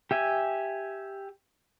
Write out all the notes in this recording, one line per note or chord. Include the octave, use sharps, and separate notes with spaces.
G4 E5 G#5